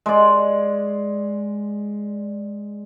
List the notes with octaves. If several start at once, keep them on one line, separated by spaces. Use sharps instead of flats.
G#3 D5